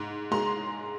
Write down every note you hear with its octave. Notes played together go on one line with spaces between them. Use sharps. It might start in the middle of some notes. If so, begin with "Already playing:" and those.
Already playing: G#2
G#3 A#5 C6